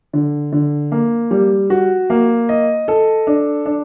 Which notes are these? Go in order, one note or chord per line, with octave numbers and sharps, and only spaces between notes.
D3
D3
A#3
G3
F#4
A#3
D#5
A4
D4
D4